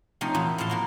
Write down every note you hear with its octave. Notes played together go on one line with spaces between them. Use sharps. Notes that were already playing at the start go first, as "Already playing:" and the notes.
C3 F3 A3 C4 C#4 D#4
E2 A#2 F4 G#4 A4 E5
A2 F3 F5 A5 C6
A3 A#3 F#4